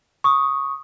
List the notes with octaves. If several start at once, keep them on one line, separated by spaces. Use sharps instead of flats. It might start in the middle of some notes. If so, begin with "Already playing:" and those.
C#6 D#6